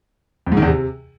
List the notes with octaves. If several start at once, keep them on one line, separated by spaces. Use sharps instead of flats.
F2
G#2
D#3
E2
C3